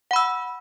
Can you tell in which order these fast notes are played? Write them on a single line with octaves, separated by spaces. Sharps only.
F#5 B5 E6